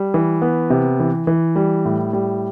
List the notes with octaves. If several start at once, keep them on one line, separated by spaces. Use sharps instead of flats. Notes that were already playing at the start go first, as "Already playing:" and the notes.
Already playing: G3
E3
B3
C3
E3
E3
G3
A2
G3